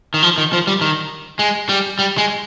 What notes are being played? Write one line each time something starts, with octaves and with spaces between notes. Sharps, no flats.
D#3
F3
D#3
F3
G3
D#3
G#3
G3
G3
G#3